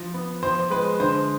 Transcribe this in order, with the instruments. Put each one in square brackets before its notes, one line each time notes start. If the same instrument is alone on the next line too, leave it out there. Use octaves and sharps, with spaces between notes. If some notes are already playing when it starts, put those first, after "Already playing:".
Already playing: [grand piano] F3
B3
F3 C5
G#3 B4
D3 C5